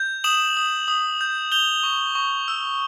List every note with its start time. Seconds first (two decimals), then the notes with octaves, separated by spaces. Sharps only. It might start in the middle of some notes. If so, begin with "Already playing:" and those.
Already playing: G6
0.24 D#6 E7 F#7
0.57 D#6
0.88 D#6
1.21 G6
1.52 G6 F7 G7
1.83 C#6
2.15 C#6
2.48 E6